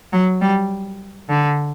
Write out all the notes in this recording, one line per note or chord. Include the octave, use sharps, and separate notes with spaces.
F#3
G3
D3